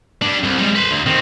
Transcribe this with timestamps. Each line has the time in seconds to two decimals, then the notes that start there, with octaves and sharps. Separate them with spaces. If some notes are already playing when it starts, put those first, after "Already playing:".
0.22 G3 D4
0.43 C2
0.58 G3 G#3
0.75 B4 C5
0.91 D2
1.06 D#3 C4